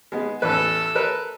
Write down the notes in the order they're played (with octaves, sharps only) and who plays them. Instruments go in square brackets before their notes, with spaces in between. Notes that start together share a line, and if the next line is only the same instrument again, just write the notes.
[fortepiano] G#3 B3
[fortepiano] A1 E2 B4 [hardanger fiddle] A4
[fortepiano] A#4 B4